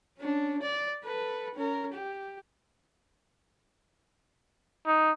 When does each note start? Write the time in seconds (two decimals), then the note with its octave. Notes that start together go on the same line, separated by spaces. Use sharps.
0.18 C#4 D4
0.62 D5
1.04 A4 B4
1.54 C#4 A#4
1.92 G4
4.86 D#4